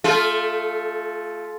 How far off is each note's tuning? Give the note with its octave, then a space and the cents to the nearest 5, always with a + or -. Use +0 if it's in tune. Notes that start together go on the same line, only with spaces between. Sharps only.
A3 +0 F4 +0 A4 -40